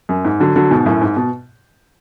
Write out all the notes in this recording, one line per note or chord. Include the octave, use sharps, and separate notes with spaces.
F#2
G#2
D3 F#3
D3 F#3
G#2 B2
F#2 A2
G#2
B2